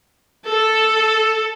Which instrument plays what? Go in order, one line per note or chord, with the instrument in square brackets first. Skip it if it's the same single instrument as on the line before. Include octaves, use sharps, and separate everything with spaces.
[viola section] A4